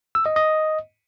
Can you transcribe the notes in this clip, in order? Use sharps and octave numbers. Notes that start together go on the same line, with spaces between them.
E6
D#5
D#5